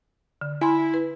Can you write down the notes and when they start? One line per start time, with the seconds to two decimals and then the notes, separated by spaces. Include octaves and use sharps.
0.41 D3
0.61 E4 G#5 B5 C6
0.94 B4